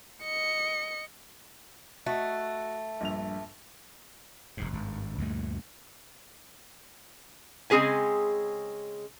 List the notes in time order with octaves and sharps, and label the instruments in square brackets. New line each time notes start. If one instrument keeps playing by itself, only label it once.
[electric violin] D#5 C#7
[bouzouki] A3 [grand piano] F#4 D#5
[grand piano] A#1 G2 F7
[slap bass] F1 D#2 G#2
G#1 G2
D2 G2 A#2 A3
[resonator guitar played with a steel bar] C#3 G#3 C4 G#4 B4 G#5